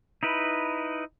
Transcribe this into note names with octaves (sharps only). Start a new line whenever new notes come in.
D#4 E4 B4